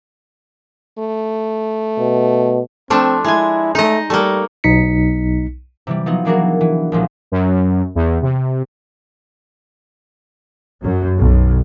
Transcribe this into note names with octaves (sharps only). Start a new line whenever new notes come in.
A3
B2
F3 A3 C4 D4
G#3 E4 G#5
A3 D#4 D#5
G3 A3 A#3
B1 D#4 B6 C#7
C3 E3 G3
F3 F#3 B3 D#4
E3 A#3 D4 F#4 G#4 A#4
E3
B1 A#2 F3 G#3
F#2
E2
C3
F#2
B1